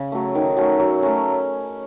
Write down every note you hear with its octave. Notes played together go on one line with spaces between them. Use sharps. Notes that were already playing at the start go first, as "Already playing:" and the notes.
Already playing: C#3
F#3 A3
D#3
F#3 A3 C#4
F#3
A3 C#4